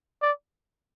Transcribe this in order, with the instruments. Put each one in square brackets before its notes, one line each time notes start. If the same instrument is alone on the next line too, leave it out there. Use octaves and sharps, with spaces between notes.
[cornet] D5